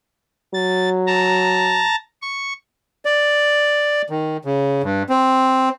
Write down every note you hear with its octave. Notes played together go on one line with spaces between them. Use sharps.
F#3 A6
A5 A#5
C#6
D5
D#3
C#3
G2
C4